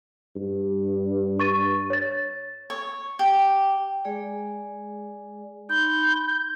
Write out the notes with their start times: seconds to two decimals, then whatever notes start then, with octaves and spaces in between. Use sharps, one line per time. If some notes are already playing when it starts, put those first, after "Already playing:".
0.36 G2
1.39 C#6 A6 D#7
1.90 C#5 A6
2.70 C#5
3.19 G4
4.05 G#3 G#4 D5
5.69 D#4 B5 C6 G6